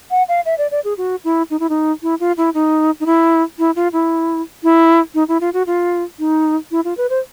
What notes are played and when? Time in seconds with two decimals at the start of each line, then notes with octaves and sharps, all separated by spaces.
0.11 F#5
0.28 F5
0.46 E5
0.58 D5
0.71 D5
0.85 G#4
0.98 F#4
1.24 E4
1.51 D#4
1.60 E4
1.69 D#4
2.03 E4
2.20 F4
2.37 E4
2.54 D#4
3.00 D#4
3.06 E4
3.59 E4
3.76 F4
3.93 E4
4.63 E4
5.15 D#4
5.28 E4
5.41 F4
5.54 F#4
5.67 F4
6.19 D#4
6.71 E4
6.85 F4
6.97 B4
7.10 C5